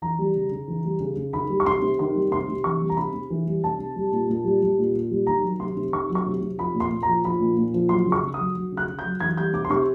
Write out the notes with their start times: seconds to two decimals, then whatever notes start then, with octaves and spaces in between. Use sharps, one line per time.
0.02 E3 A#5
0.19 G3
0.36 C#3
0.51 C#3
0.68 E3
0.85 G3
1.00 C#3
1.17 C#3
1.33 D#3 B5
1.50 G3
1.60 C#6
1.66 C3 C6
1.82 C3
1.99 D#3 C6
2.15 G3
2.31 C3 C6
2.49 C3
2.64 E3 C#6
2.81 G3
2.89 A#5
2.97 C3 B5
3.13 C3
3.30 E3
3.47 G3
3.64 C3 A5
3.79 C3
3.96 G3
4.12 A#2
4.29 A#2
4.45 G3
4.62 G3
4.78 A#2
4.94 A#2
5.11 G3
5.27 D#3 A#5
5.43 F#3
5.59 C3 C6
5.77 C3
5.92 D#3 C#6
6.09 F#3
6.15 C#6
6.26 C3
6.41 C3
6.58 F3 B5
6.74 A#2
6.80 C6
6.91 A#2
7.03 F3 A#5
7.24 F3 B5
7.40 A#2
7.57 A#2
7.74 F3
7.89 F#3 C6
8.06 C#3
8.12 C#6
8.22 C#3
8.34 F#3 D#6
8.55 F#3
8.72 C#3
8.77 F#6
8.88 C#3
8.99 G6
9.05 F#3
9.20 E3 G#6
9.37 G3 G6
9.53 C3 D6
9.65 C6
9.70 C3 C#6